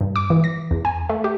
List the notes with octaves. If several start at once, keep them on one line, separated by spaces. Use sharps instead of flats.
G2
D6
E3
A#6
E2
G#5
A3
G4